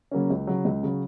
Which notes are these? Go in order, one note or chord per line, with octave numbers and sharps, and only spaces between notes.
C#3 F#3 A#3 C#4
C#2
C#3 F#3
C#2
C#3 F#3